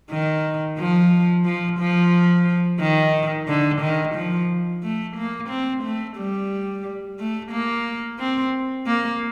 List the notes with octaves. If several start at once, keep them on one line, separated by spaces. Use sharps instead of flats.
D#3
F3
F3
F3
D#3
D3
D#3
F3
A3
A#3
C4
A3
G3
A3
A#3
C4
A#3